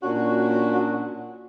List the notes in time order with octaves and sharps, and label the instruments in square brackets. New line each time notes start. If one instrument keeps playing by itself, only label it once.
[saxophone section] A#2 C#4 D4 F#4